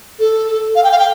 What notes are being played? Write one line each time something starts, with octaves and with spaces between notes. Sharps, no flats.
A4
F5
G5
F5
G5